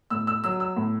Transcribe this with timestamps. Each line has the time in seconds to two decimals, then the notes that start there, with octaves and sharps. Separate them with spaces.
0.10 A2 E6
0.27 E6
0.44 F#3 E6
0.60 E6
0.76 A2